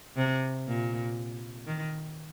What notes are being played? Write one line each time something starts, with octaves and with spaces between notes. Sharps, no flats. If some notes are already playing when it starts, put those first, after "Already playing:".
C3
A#2
D#3